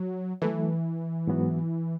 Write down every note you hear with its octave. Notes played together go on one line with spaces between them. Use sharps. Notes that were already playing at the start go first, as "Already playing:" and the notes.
Already playing: F#3
E3 F#3 A3 E4 A4
G#2 F#3 B3 F#4